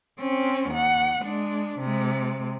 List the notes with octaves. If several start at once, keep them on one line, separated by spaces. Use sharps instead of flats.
C4 C#4
D#2 F#5
G#3 D4
C3 G#3